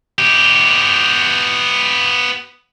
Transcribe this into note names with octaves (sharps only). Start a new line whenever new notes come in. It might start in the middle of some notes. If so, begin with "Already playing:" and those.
B3 G4